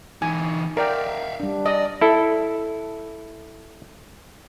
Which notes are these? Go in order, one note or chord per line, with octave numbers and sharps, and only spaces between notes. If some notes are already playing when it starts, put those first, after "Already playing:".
E3 D#4 G#5
A#4 D5 E5 F5 G5
G3 D4
D5 D#5
E4 A4